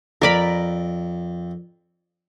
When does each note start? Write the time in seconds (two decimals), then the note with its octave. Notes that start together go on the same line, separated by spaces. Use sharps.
0.22 F2 A#4 D5 B5